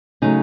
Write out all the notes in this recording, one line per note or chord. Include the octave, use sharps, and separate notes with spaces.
C#3 F#3 A3 D#4